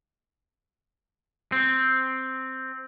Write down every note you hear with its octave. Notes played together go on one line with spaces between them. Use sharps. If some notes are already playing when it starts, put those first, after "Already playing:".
C4